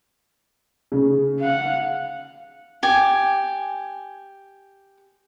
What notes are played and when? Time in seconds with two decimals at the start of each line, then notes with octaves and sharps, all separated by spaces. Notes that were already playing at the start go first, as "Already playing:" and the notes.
0.92 C#3
1.40 F5 F#5
2.83 G4 G#5 D6